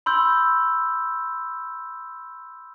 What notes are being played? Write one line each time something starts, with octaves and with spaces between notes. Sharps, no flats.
B5 C6 E6 G6